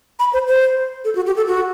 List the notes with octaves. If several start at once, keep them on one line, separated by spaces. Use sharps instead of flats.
B5
C5
C5
A4
F#4
G4
A4
F#4